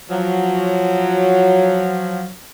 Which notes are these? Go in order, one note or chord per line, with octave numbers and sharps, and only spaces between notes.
F3 F#3